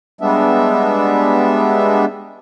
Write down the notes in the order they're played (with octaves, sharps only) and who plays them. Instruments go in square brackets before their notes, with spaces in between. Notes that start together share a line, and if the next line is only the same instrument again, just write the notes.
[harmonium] G3 G#3 B3 D4 E5